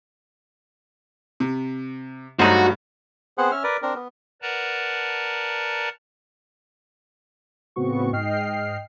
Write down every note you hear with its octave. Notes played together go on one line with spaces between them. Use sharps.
C3
G2 F#3 A3 D#4 F#4 C5
B3 C4 G#4 C5 F#5
C#4 E5 F6
A#4 B4 D5
C4 D4 A#4
B3
A#4 B4 D5 F#5 A5 A#5
A2 C#3 B3 C4 F#4 C#6
G#2 D#5 G5 F6 C7